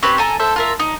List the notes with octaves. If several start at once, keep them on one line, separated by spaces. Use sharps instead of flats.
C4 C#4 G4 B4
A4 G#5 A#5
A4 C5 E5
F4 A#4 E5
D#4